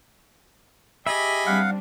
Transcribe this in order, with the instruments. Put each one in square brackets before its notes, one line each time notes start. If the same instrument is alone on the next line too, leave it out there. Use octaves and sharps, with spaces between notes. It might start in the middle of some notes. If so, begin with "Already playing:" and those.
[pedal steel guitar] G4 G#4 E5 [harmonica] D#5 G#5 B5
[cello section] G3 C4 D4 [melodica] F5 F#5